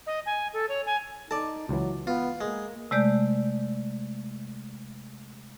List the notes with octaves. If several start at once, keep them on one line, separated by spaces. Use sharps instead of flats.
D#5
G#5
A4
C#5
G#5
D#4 A4 D5 A5
C#2 E3 F#3
B3 F4
G#3 A#3
C3 G#3 A3 D5 G6